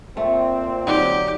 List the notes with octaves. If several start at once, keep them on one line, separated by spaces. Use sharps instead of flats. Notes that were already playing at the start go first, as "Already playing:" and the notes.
A#2 A3 C4
D3 F#3 D#4 G4